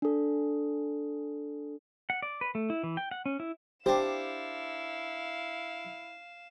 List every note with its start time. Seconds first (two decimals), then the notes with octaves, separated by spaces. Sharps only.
0.02 D4 A4
2.10 F#5
2.22 D5
2.41 B4
2.55 A3
2.70 E4
2.83 E3
2.97 G5
3.11 F#5
3.26 C#4
3.40 E4
3.86 D4 E4 G4 C5 F5 E7